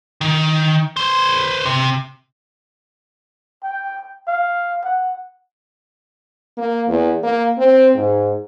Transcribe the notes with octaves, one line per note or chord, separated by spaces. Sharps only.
D#3
B4 C5
C3
G5
F5
F#5
A#3
E2
A#3
C4
G#2